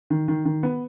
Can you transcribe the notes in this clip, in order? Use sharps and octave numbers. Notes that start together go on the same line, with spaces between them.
D#3
D#3
D#3
B3